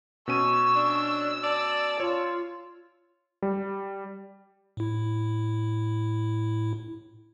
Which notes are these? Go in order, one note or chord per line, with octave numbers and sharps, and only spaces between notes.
B2 C#4 C#6 E6 D#7
D4
D5 A5
F4 C#5
G3
A2 E4